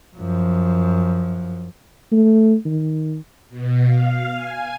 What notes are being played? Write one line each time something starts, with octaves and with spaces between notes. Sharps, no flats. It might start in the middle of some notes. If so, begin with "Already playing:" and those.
F#2 F3
A3
D#3
B2
F5
G#5